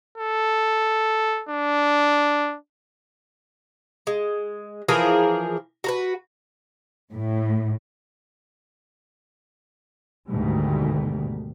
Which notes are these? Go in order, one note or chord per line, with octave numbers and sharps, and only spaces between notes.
A4
D4
G#3
E3 F3 G#4 A#4
F#4 A#4 B4
A2
D2 G#2 B2 D#3 G3 A3